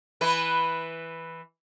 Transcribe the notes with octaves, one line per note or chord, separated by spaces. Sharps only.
E3 B4